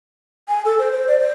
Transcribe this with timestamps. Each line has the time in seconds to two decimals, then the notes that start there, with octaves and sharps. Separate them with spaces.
0.48 G#5
0.65 A4
0.79 C5
0.92 C5
1.08 D5
1.19 C5